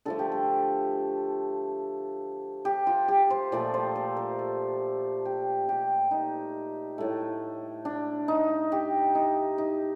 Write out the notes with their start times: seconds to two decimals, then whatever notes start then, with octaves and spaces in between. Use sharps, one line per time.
0.05 D3 F3 A3 A4
0.19 G4
0.32 A4
2.65 G4
2.87 F4
3.08 G4
3.30 C5
3.52 A#2 F3 A3 D5
3.74 C5
3.96 A4
4.17 A#4
4.39 A4
5.25 G4
5.69 G4
6.11 D#4
6.98 A2 A3
7.85 D4
8.28 D#4
8.72 G4
9.15 D#4
9.58 D#4